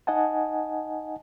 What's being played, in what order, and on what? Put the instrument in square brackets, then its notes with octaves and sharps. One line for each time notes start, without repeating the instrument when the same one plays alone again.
[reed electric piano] D#4 D#5 F#5 G#5 A5